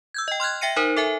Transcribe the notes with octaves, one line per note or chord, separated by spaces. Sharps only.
E6 G6 G#6
D#5 G5
C6 F6 F#6 G#6
E5 G5 A#6 C#7 D#7
D#4 A#4 C5
A4 E5 G#5